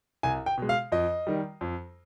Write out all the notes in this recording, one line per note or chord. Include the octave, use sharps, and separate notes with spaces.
C2 G#5
G5
B2 G#3
F5
F2 D#5
D#3 G3
F2